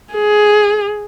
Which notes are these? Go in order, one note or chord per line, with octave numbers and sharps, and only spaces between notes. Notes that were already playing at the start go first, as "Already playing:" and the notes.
G#4